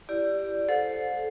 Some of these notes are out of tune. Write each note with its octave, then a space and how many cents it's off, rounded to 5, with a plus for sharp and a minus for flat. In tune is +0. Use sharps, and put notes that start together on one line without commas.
E4 +30 G4 +5 D5 +0
A4 -15 C5 +0 F#5 -45